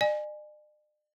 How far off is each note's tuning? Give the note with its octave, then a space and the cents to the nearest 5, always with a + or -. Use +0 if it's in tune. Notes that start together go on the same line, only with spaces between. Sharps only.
D5 +45 G#5 +0